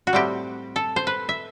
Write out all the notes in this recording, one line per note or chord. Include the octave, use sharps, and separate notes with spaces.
F#4
A2 G3 C4 G4
A4
C5
B4
E5